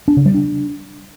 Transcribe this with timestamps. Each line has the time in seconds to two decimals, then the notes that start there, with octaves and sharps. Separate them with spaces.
0.08 D4
0.17 C#3
0.26 G3
0.34 D4